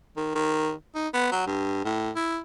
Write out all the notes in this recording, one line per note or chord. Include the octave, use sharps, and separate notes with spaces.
D#3
D#3
D#4
B3
F#3
G2
A2
E4